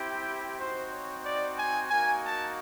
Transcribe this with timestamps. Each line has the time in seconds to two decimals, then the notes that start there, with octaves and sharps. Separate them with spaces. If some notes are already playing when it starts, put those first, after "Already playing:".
Already playing: C4 E4 G4
0.59 C4 D#4 F#4 C5
0.92 C#5
1.24 D5
1.57 G#5
1.90 A#3 D#4 F#4 G#5
2.23 A5